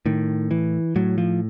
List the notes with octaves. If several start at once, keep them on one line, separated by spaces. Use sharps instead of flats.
A2 D#3
E3
A2 F#3
F3